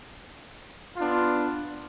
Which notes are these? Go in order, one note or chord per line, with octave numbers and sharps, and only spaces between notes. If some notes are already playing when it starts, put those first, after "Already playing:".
B3 D4 F4